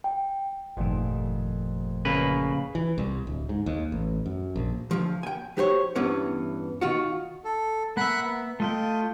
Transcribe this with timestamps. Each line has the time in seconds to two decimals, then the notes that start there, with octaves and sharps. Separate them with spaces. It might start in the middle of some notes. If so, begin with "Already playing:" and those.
0.04 G5
0.77 G1 F2 A#2 D#3 A3
2.05 C#3 A#3 B4
2.75 E3
2.98 C2
3.27 D1
3.49 G#2
3.66 D#2
3.92 A1
4.26 F#2
4.56 A#1
4.91 D2 F3
5.23 G5 G#5
5.57 F#3 G4 C5 C#5
5.95 E2 G2 E3 B3 C#4
6.81 D#3 F4 F#4
7.44 A4
7.97 A#3 E5 F#5 B5 F#6
8.24 B3
8.60 A3 F4 D#5 G5